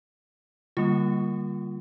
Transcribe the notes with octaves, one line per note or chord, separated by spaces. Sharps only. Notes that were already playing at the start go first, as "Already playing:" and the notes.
D3 G3 A#3 F4